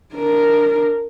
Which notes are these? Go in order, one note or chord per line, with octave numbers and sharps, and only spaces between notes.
D4 A#4